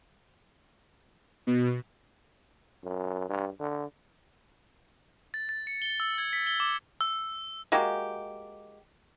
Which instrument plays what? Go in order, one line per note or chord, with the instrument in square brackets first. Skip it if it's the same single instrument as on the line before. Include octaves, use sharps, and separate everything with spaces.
[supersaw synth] B2
[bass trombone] F#2
G2
D3
[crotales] A6
A6
C#7
G7
E6
G#6
B6
G7
D6
E6
[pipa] G#3 A#3 F#4 G4